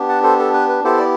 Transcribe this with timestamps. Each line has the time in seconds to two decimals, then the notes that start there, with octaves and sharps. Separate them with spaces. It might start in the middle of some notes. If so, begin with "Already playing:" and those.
Already playing: B3 D4 G4
0.09 F#5 A5
0.23 A4 C5
0.39 A4
0.54 B4
0.69 B4
0.84 B3 E4 G4 A4 C5
0.99 D5